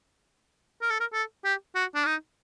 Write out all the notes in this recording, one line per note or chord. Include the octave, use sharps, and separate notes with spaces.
A#4
A4
A#4
A4
G4
F#4
D4
D#4